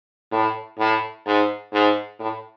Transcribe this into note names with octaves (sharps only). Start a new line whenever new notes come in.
A2
A2
G#2
G#2
A2